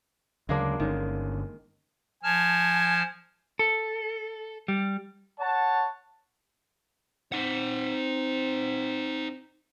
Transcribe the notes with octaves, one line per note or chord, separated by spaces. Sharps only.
D2 C#3 F#3 G#3 A#3 D4
G1 D3 D#3 C#4
F3 G#5 A5 F6
A4
G3
C#5 F#5 A5
C4 D#4 F#5